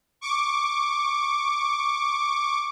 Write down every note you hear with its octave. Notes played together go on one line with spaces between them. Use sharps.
C#6 D6